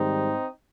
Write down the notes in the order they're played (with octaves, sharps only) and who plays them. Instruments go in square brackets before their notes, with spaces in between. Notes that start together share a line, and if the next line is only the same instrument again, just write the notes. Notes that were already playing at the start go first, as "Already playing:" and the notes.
Already playing: [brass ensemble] G#2 D#3 G3 C4 D#4